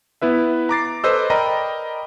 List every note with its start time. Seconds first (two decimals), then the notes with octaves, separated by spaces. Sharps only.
0.22 B3 E4 B4 E5
0.69 A#5 D6 A6 C7
1.04 A4 B4 C5 D#5 E6
1.30 A#4 D5 D#5 G5 A#5 B5